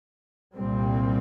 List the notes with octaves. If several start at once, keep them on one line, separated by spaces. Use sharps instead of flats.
C2 A#2 G3 C4